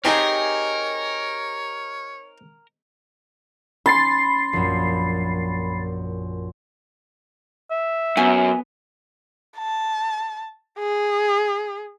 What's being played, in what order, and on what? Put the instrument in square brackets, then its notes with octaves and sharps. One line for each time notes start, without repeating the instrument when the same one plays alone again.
[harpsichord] C4 D#4 [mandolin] G4 G#4 D#5 [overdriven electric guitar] A#4 [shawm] C#5
[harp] C#4 [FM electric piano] B5 A6 C7 [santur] C6
[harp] A#1 F#2
[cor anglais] E5
[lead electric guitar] F#2 [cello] B3 [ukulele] G#5
[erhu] A5
G#4